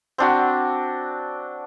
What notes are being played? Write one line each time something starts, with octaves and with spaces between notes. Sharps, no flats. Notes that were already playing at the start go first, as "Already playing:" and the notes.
C4 D4 F#4